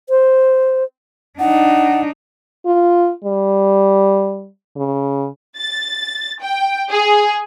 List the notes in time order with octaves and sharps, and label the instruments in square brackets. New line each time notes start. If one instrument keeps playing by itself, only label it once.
[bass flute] C5
[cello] D4 D#4 [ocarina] F#5
[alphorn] F4
G3
C#3
[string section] A6
G5
G#4